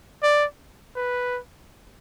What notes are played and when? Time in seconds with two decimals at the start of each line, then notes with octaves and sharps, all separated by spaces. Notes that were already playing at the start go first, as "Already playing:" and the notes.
0.23 D5
0.96 B4